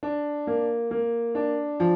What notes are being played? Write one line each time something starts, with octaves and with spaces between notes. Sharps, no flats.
D4
A#3
A#3
D4
F3